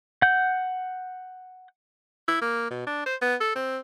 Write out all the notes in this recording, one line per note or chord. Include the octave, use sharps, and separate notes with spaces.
F#5 G6
E4
A#3
B2
D4
C5
B3
A4
C4